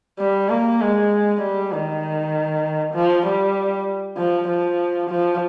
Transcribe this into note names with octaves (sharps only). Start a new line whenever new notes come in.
G3
A#3
G#3
G3
D#3
F3
G3
F3
F3
F3